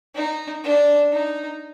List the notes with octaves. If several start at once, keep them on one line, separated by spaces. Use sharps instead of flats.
D#4
D4
D#4